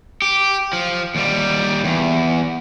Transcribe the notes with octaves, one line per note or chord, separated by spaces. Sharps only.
G4
F3
D#2 G3
E2